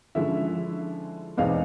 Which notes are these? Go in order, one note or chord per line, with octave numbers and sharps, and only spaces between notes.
D3 F3 G#3 C#4 E4 E5
E2 B2 G#3 C4 D#4 F5